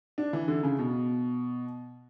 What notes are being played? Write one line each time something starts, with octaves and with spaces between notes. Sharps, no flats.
D4
E3
D3
C#3
B2